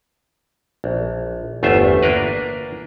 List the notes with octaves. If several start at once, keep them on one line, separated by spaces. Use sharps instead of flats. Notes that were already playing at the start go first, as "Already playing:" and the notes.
A#1
G1 E2 A3 F4 C5 E5
A#3 D4 A#4 B4